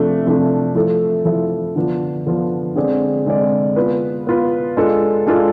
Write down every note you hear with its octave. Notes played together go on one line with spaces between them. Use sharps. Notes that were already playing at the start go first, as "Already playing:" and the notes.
Already playing: C3 F3 A3 D4
C3 F3 A3 D4
F3 A3 E4 A4
F3 A3 E4 A4
D3 F3 B3 D4 F4
D3 F3 B3 D4 F4
D3 G#3 C4 G#4 D5
D3 G#3 C4 G#4 D5
B3 F4 B4
B3 F4 B4
G#3 D4 F4 A4
G#3 D4 F4 A4